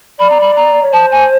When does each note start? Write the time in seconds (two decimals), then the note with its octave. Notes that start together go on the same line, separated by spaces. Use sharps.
0.19 D5 B5
0.30 A#5
0.40 B5
0.56 A#5
0.83 C#5
0.93 C5 A5
1.12 G#5